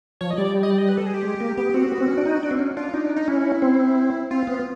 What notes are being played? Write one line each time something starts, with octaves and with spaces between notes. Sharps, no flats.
F3 C#5
D#5
G3 D5
D#5
D5
D#5
B4
A4
G#4
G4
G#3
A#3
B3 G4
C4 F#4
B3
C4
C#4
D4
D#4
D4
C4
C#4
D4 F4
D4 D#4
D#4
C#4 E4
C4
C4 F4
B3